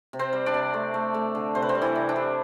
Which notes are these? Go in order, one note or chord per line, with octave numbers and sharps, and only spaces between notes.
C3
C4 C5
G3
D4 D5
C3
A3
A3
A3
D3
C3 C5
B4
C4 C5
G3
E3 E4
C3
D4
G3